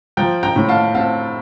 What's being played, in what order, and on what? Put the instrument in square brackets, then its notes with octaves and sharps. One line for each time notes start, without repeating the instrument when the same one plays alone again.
[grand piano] F3 G5 A#5
G5 A#5
A2
F5 A5
C4 F5 A5